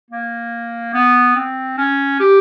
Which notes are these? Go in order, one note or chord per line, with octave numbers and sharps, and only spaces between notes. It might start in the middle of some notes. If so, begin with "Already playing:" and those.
A#3
B3
C4
C#4
G4